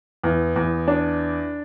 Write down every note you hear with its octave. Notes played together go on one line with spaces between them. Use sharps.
E2
E2
D4